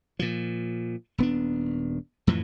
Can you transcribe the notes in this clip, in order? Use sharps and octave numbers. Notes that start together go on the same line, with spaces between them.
A#2 F3
D#1 B3 D4
F2 A2 E3 F3